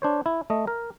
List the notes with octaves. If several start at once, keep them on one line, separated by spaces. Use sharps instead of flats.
D4 C5 C#5
E4
A3 D#5
A#4